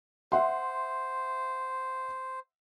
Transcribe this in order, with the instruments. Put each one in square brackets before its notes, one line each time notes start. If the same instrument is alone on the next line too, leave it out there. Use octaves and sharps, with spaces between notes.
[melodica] C5 [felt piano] E5 F#5 C6